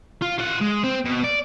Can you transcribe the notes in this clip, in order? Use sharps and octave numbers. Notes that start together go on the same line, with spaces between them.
F4
F4 F#5
G#3
C4
B2
D5